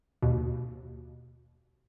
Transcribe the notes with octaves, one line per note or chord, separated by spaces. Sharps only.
D#2 B2